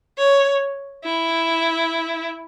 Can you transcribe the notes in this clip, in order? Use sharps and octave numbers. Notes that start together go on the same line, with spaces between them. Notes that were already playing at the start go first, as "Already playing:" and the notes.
C#5
E4